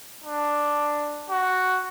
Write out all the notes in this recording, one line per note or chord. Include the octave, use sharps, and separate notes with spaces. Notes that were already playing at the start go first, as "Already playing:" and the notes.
D4
F#4